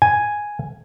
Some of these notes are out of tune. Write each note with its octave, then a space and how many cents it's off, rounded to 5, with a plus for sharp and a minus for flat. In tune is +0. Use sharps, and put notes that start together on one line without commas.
G#5 +0